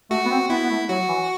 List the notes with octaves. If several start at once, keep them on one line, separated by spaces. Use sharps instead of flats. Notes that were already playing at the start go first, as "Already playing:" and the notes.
A3 F#4
B3
C4
B3 E4
B3
A3
F#3 F#4
E3